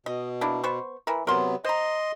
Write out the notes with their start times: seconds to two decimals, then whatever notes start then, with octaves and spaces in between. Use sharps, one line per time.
0.06 B2 D#5
0.41 A#3 D4 E4
0.64 B3 C5 C#6
1.07 E3 A#4
1.27 C3 F#3 B3 A#4 C6
1.64 C5 D#5 A#5 C6